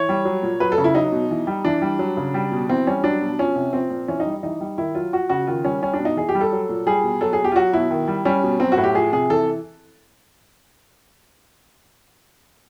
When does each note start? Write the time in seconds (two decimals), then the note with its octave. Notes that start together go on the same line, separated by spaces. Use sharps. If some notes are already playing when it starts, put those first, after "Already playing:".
Already playing: E3 C#5
0.09 G3
0.25 F#3
0.43 A#2
0.60 F#3 B4
0.72 A4
0.78 C#3
0.84 E4
0.95 F#3 D#4
1.12 B2
1.31 E3
1.47 G3
1.65 E3 D4
1.82 G3
1.99 F#3
2.17 C#3
2.34 G3
2.52 B2
2.69 E3 C4
2.87 G3 C#4
3.04 F#3 D4
3.22 B2
3.39 F3 C#4
3.56 C3
3.73 F3 C4
3.90 A#2
4.08 E3 C#4
4.20 D#4
4.26 G3
4.43 E3 D#4
4.61 G3
4.78 D#3 E4
4.95 F#3 F4
5.12 F3 F#4
5.30 C#3 F#4
5.47 D#3 F4
5.65 G3 C#4
5.82 G3 C#4
5.93 D4
5.99 B2
6.05 D#4
6.17 E3 G#4
6.29 G4
6.35 G3
6.41 A4
6.52 F#3
6.69 A#2
6.87 G3 G#4
7.04 B2
7.21 F#3 A4
7.33 G#4
7.39 B2
7.44 G4
7.52 F4
7.56 F#3 F#4
7.73 B2 E4
7.91 D#3
8.08 G3
8.25 G3 C#4
8.44 B2
8.60 F#3 C4
8.72 F#4
8.77 A2
8.84 G4
8.95 F3 G#4
9.13 C3 G#4
9.30 E3 A4